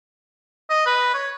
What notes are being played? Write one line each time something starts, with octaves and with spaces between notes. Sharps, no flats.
D#5
B4
C#5